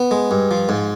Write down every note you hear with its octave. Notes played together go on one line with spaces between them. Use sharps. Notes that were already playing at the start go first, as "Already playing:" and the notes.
Already playing: B3
G#3
G2
F3
G#2